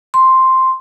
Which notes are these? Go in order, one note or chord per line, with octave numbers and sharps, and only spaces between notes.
C6